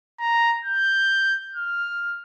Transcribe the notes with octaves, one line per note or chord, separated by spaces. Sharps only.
A#5
G6
F6